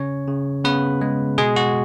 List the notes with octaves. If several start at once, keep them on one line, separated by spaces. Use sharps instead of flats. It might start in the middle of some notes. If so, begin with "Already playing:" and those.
Already playing: C#3 C#4 C#5
C#3
C#3 B3 B4
G#3
B2 G#3 G#4
F#4